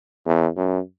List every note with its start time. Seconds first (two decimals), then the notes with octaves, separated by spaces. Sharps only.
0.26 E2
0.57 F#2